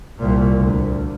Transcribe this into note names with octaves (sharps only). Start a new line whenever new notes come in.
C2 A#2
D2